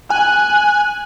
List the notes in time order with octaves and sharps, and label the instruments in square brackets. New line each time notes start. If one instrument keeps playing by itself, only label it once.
[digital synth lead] G#5 [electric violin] F#6